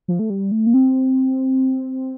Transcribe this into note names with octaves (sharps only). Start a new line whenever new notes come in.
F3
A3
G3
A3
A#3
C4